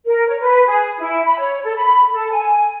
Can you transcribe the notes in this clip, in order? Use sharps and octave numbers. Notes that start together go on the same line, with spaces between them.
A#4
C#5
B4
G#4
E4
B5
C#5
A4
B5
A4
G#5